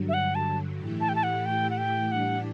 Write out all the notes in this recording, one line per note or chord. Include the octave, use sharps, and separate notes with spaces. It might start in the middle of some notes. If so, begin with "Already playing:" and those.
Already playing: G2 D3 F#3
E5
F#5
A5
A2 E3 A3 E4 G4
A5
G5
A5
F#5
G5
F#5
G5
A2 E3 G3 D4 G4 F#5